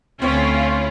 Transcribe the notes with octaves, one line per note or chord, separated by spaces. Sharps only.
D2 C4 C#4 E4 F4 C#5